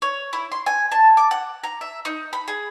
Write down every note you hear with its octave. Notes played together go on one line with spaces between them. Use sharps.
C#5
E4
C6
G#5
A5
D6
F#5
A#5
E5
D#4
B5
G#4